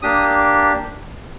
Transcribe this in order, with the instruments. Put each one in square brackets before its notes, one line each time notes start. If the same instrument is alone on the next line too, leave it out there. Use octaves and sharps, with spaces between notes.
[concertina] A#3 D4 G4 D#6